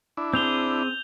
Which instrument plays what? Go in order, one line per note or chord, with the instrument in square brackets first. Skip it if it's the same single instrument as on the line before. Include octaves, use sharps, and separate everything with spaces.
[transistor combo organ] D4 E4
[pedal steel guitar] C4 G#4 [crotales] G6 F7 G7